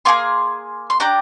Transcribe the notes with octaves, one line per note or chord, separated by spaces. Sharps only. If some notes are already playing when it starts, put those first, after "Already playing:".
A#3 F4 G#4 C6
C6
D4 G4 A#5